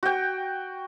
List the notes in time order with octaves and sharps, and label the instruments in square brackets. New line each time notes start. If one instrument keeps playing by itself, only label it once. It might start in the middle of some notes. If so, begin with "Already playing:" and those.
[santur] F#4 G5